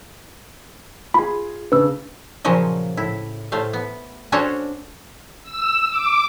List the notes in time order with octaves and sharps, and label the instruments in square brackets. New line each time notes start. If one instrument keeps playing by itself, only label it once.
[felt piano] F4 G#4 [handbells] B5
[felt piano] C#3 D4 [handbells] B4 E6
[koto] A#2 C#3 F3 F#3 D#5
A2 E4
A2 A3 C5 F5
B3
C#4 D4 F#4 A4 C5 C#5
[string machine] E6
D6